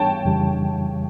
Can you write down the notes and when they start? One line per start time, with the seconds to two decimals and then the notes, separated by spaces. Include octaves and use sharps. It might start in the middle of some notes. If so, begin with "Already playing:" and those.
Already playing: G#2 E3 G3 B3 C#5 G5 A5
0.25 F2 C#3 E3 G3